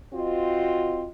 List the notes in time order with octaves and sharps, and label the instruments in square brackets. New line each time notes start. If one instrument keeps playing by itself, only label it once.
[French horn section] C4 F4 F#4 D#5